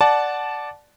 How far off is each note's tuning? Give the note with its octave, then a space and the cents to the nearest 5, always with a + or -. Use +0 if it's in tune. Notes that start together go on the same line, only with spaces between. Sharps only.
D5 +0 F#5 +0 A5 -15